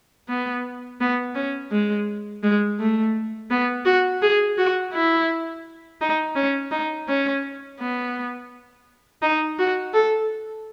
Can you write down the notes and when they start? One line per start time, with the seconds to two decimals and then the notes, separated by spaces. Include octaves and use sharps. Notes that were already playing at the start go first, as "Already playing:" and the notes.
0.28 B3
1.00 B3
1.35 C#4
1.72 G#3
2.43 G#3
2.80 A3
3.51 B3
3.86 F#4
4.22 G#4
4.58 F#4
4.93 E4
6.01 D#4
6.36 C#4
6.72 D#4
7.08 C#4
7.79 B3
9.22 D#4
9.59 F#4
9.94 A4